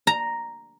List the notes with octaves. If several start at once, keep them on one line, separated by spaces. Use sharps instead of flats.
A#5